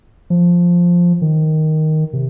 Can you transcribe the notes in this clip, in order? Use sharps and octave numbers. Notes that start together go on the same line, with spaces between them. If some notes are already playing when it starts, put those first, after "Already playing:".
F3
D#3
C3